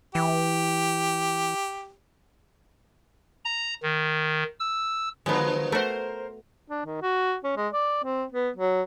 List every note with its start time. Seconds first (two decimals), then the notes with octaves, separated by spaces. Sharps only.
0.15 E3 G4
3.45 A#5
3.83 D#3
4.59 E6
5.26 D3 F3 F#3 G#3 B3
5.72 A3 F#4 A#4 C5
6.70 D4
6.86 D#3
7.02 F#4
7.44 C#4
7.57 G#3
7.73 D5
8.04 C4
8.33 B3
8.57 F#3